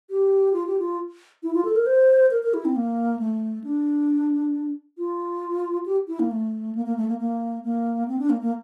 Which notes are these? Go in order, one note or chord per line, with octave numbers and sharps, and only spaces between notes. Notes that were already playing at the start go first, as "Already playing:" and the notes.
G4
F4
G4
F4
E4
F4
A4
A#4
C5
A#4
A#4
E4
C4
A#3
A3
D4
F4
G4
E4
A#3
A3
A#3
A#3
A3
A#3
A#3
A#3
C4
D4
A#3
A#3